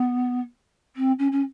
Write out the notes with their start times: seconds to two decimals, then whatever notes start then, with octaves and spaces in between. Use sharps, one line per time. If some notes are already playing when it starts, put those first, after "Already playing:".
Already playing: B3
0.96 C4
1.19 C#4
1.31 C#4